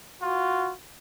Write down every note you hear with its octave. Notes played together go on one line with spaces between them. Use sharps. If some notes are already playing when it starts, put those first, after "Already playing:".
F4 F#4